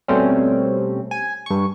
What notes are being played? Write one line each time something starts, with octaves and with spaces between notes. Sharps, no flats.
B2 G3 A3 C4 C#4
G#5
G2 C#6